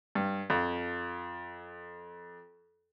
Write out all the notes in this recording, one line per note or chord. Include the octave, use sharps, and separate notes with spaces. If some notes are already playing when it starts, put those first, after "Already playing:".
G2
F2